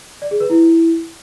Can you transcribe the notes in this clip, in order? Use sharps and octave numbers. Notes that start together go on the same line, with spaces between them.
D5
G#4
B4
E4